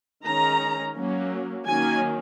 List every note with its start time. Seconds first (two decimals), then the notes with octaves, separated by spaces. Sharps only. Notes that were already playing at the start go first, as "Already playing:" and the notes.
0.24 D#3 G#3 C#4 A#5
0.95 F#3 A#3 C#4
1.66 D#3 F#3 A#3 C#4 G#5